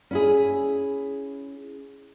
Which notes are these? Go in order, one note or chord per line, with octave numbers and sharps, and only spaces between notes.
C#4 E4 G#4